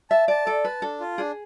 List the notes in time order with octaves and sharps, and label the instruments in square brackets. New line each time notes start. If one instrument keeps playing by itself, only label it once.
[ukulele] E5 [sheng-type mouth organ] A5
[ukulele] D5 [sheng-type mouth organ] A5
[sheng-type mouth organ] A4 [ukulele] D5
[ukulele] B4 [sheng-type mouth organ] A5
[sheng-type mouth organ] D4 [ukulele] A4
[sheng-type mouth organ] F4
[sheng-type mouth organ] D4 [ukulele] G#4